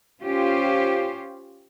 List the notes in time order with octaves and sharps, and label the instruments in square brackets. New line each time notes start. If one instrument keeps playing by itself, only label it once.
[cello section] C#4 F4 G4 C5